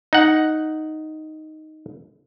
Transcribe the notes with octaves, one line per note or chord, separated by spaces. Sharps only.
D#4 F#5